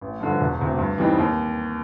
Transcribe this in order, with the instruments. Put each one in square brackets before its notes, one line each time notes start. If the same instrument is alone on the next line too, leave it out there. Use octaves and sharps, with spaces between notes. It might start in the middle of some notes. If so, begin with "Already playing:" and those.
[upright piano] A1
G2 D3 F3
E1
D2 C3
G2
E3 G3 C4 D#4
D#2